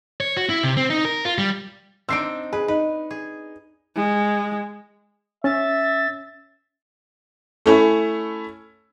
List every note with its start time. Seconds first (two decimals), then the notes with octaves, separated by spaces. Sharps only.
0.20 C#5
0.37 F#4
0.49 E4
0.63 C3
0.77 C4
0.90 D#4
1.05 A#4
1.25 F4
1.38 G3
2.09 C4 D4 D#4 E6 C7 D7
2.53 G#4 B4
2.68 D#4 B4
3.11 G#4
3.95 G#3
5.44 C#4 E5 A6
7.66 A3 C#4 E4